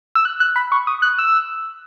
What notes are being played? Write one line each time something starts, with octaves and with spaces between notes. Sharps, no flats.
E6
F#6
F#6
B5
C#6
D#6
F#6
E6